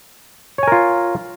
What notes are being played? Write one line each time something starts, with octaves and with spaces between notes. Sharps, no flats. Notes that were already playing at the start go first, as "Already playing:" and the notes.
F4 A#4 C#5 G#5